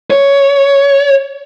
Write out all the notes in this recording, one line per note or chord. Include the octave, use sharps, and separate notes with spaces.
C#5